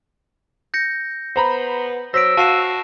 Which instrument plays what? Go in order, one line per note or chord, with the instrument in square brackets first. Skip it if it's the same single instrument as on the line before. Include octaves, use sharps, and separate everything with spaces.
[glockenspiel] G6 A#6 C#7
[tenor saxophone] B3 [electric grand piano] C5 A#5 B5
[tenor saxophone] F#3 [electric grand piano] C5 [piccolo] E6 [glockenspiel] A#6 B6 D7
[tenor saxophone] F#4 [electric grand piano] F5 [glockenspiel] A5 C7 E7